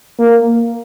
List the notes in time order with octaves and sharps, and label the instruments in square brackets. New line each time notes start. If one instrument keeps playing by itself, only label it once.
[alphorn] A#3